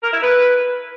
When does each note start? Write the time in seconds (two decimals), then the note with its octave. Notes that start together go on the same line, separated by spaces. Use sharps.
0.02 A#4
0.12 E4
0.22 B4